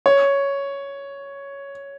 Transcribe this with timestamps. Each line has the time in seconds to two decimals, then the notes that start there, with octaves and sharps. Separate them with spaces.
0.06 C#5